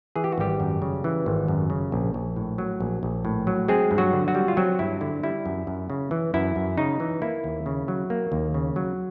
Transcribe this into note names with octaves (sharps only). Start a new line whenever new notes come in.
E3 G#4
G4
F#4
G#1 G3 G4
F#2
C#3
E3
G#1
F#2
C#3
A#1
A#1
A2
F#3
A#1
A#1
A2
F#3
G#3 C4 G#4
G2
F#3 F#4
D3
F#3 F#4
G3
F4
F#3 C4 F#4
G2 E4
D3 E4
G3 E4
F#2
F#2
C#3
E3
F#2 E4
F#2
C#3 D#4
E3
A#3 E4
D#2
C#3
F#3
A#3
D#2
C#3
F#3